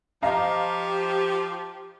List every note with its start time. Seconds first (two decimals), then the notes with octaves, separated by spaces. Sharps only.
0.23 F3 G4 D#5 F5 A5 A#5 D6